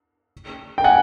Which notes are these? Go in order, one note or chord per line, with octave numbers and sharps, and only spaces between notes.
G5
F#5 G#5